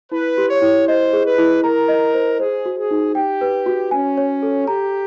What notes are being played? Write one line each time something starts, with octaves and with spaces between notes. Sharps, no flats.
E4 B4
G4
C#5
E4
C5 D#5
G#4
B4
E4
A#4 A#5
D#5
C5
G#4 C5
F#4
G#4
D#4
G4 G5
B4
F#4
C#4 G#5
C#5
A4
G4 A#5